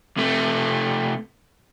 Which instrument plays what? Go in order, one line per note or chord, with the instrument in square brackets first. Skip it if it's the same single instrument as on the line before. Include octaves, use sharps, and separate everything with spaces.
[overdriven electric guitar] C3 A3